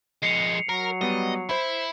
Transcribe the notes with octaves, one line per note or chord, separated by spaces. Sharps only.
F2 G#3 C7 C#7 F7
F#3 A#4
G3 B3 D#5
E4 C5 B5